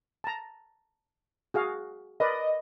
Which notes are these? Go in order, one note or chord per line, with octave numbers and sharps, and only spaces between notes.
A5 A#5
F#4 G#4 F5
A#4 B4 D5 D#5